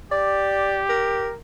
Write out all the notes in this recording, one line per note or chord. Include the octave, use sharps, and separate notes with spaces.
G4 D5
A#4